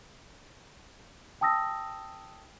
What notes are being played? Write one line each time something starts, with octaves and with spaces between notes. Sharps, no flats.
G5 A5 D#6 E6 A#6